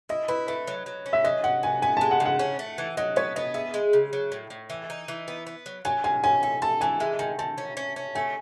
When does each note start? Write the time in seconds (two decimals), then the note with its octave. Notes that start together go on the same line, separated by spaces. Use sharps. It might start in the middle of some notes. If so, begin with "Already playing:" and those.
0.09 E4 D#5
0.28 E4 B4
0.47 A3 B4
0.67 F#3
0.86 F#3
1.06 C#4
1.13 E5
1.24 F#3 D#5
1.44 F#3 F#5
1.63 B3 G#5
1.82 B3 G#5
1.97 G#3 A5
2.11 F#5
2.20 C#3
2.25 F#5
2.39 C#4
2.59 A3
2.78 E3
2.97 F#3 D#5
3.16 B3 C#5
3.36 B3 D#5
3.54 G#4 E5
3.74 G#3
3.93 C#3
4.13 F#3
4.32 A2
4.50 A2
4.70 E3
4.90 D#4
5.08 E3
5.28 B3
5.47 B3
5.66 F#3
5.85 F#3 G#5
6.04 A2 G#5
6.24 C#4 G#5
6.43 A4 G#5
6.62 A4 A5
6.81 E3 G#5
7.00 G#3 E5
7.19 D#3 G#5
7.39 D#3 A5
7.58 C#4
7.77 C#4
7.96 C#4
8.15 A3 G#5